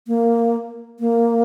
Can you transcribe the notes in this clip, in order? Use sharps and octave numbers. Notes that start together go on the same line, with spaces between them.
A#3
A#3